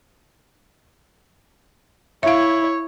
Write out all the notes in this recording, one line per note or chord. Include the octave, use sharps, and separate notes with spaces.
E4 C#5 E5 F5